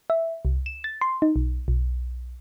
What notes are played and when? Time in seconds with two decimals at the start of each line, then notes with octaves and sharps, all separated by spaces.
0.10 E5
0.45 C2
0.66 E7
0.84 A6
1.01 C6
1.22 D#4
1.36 B1
1.68 B1